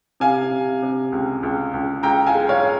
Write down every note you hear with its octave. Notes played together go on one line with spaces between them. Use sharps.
C3 F5 G#5
C3
C3
C#2
C#2
C#2
C#2 G5 A#5
F5 G#5
G#3
C#5 F5